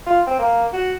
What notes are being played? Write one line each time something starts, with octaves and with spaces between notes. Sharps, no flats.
F4
C4
A#3
F#4